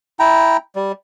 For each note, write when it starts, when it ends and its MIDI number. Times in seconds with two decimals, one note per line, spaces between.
0.19 0.57 64
0.19 0.57 79
0.19 0.57 82
0.76 0.92 55